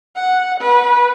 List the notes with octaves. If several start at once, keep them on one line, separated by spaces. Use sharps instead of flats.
F#5
B4